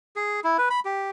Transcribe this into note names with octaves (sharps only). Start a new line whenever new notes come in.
G#4
E4
B4
B5
G4